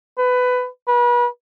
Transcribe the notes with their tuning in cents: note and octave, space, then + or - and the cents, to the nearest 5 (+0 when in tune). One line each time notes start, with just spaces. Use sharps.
B4 +15
B4 -35